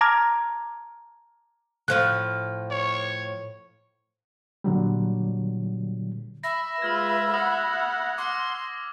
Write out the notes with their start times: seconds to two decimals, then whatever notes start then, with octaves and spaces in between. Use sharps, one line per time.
0.01 A5 A#5 D6 F6 G#6
1.88 A2 F3 F4 F#6
2.71 C#5
4.64 A#2 D3 F#3 G3
6.44 E5 B5 A#6
6.82 G#3 F4 B4 E6 F6 G#6
7.34 F#5 D#6 A#6 F#7
8.18 C6 D6